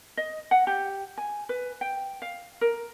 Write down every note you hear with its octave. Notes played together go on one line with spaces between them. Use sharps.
D#5
F#5
G4
G#5
B4
G5
F5
A#4